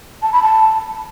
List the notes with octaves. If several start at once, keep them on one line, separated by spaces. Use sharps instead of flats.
A5
B5
A5